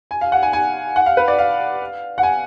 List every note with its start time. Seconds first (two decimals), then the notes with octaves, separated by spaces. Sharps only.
0.11 G#5
0.21 F5
0.32 F#5
0.43 G#5
0.53 G#5
0.96 F#5
1.06 F5
1.17 B4
1.28 D5
1.38 F5
2.18 F#5
2.23 G#5